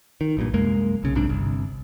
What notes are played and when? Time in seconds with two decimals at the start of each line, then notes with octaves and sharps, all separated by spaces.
0.21 D#3
0.37 A#1 G2 A#2
0.54 C2 F#2 G#3 A#3
1.03 B1 C#3
1.15 B1 G#2 C3 D4
1.29 G1 C2